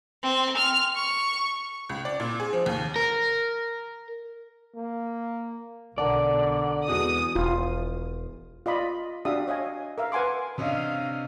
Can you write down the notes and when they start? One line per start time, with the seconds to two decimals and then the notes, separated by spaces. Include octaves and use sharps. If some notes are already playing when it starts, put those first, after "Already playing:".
0.23 C4
0.57 F6
0.96 C#6
1.89 C#2
2.05 D5
2.20 A#2
2.40 G#4
2.53 F3
2.66 D#2
2.96 A#4
4.75 A#3
5.98 B1 D3 A#4 D5 F#5 A5
6.88 E2 G#3 F#4 D#6
7.35 E1 F4
8.66 F4 D5 D#5 B5
9.25 D4 F#4 G4 E5 F5 D#6
9.48 C#5 D#5 F5 G#5
9.98 A#4 E5 F5
10.12 B4 F#5 G#5 C6 D6
10.58 C3 C#4 D4 D#5 F5